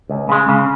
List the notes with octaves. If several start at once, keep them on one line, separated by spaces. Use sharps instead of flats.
C#2
C#3 G#3
C#3